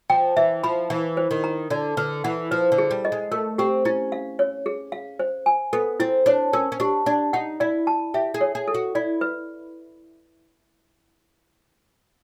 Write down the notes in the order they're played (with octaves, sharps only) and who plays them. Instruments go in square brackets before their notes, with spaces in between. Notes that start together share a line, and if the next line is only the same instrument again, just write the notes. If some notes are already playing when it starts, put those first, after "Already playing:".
[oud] F3 [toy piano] G5
[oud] E3 [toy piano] E5
[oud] F3 [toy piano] B5
[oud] E3 [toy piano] F5
[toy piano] C5
[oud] D#3
[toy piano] A#5
[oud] D3 [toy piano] D5
[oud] D3 [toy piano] B4
[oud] E3 [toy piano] F#5
[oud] F3 [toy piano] B4
[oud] D3
[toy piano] G#4
[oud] G3
[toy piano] D#5
[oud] G#3
[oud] A3 [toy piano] A#4
[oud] C4 [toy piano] G4
[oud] C#4 [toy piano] E4
[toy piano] F5
C#5
G#4
F5
C5
G#5
[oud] B3 [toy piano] A4
[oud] C4 [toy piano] E4
[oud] D4 [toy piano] C#5
[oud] C#4 [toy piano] A#4
[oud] C#4
[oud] D4 [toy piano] G4
[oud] D4 [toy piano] D5
[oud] D#4 [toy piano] F#5
[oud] E4 [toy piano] D5
[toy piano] A5
[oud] G4 [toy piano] E5
[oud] G#4
[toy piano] C#5
[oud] G#4
[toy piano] A4
[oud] F#4
[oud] E4 [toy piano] D5
[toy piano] B4